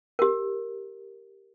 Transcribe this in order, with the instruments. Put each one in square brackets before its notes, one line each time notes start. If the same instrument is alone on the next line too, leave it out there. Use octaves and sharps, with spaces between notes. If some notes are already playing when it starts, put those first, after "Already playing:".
[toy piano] G4 A#4